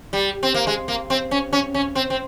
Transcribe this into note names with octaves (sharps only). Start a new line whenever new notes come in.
G3
C4
A#3
G#3
A#3
C4
C#4
C#4
C#4
C4
C4